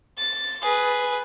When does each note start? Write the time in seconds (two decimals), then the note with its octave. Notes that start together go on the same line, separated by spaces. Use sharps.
0.18 A6
0.62 G#4 B4